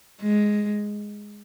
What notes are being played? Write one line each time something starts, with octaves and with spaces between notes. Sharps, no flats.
G#3